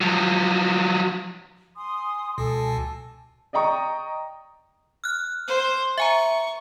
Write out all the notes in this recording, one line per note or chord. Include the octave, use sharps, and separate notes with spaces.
F3 F#3
G#5 C6 D#6
C#2 B2 A4 G#5 A5
D5 D#5 G5 A#5 C#6 D#6
F6 F#6
C5
E5 G#5 A#5 C#6